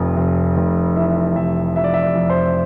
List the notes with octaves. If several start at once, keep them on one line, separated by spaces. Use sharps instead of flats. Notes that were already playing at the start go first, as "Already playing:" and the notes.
Already playing: F1 F2
F1
F1
E3 E5
F1 E5
F2 E5
D5
E5
D5
F2
C5